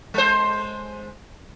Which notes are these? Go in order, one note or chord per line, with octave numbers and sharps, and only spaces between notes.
G#3 C5